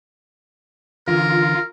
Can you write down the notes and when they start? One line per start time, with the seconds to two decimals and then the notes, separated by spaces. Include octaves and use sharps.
1.08 D3 E3 F4 A#4